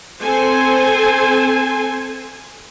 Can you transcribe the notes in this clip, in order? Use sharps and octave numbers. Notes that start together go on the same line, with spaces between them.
C4 A4 C5 G#5